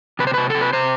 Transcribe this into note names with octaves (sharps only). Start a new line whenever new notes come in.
C3 B4
C5
C3 B4
C3 A4
B4
C3 C5